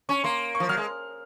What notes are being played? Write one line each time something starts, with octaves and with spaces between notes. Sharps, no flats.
C#4 C#6
A#3 C6
C#6
F3
F#3 F6
G#3